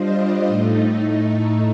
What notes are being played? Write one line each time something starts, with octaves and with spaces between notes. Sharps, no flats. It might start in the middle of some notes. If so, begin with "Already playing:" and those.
Already playing: G3 D4 F4 C5 D#5
A2 A3 D#4